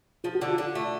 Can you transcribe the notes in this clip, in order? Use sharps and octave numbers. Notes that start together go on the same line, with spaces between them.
F3 F4
F#4
D3
F4
D3
A3